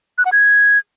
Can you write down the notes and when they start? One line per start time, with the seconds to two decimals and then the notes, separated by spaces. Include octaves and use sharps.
0.18 F#6
0.25 F#5
0.33 G#6